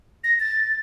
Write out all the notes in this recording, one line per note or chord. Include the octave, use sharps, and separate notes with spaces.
A#6
A6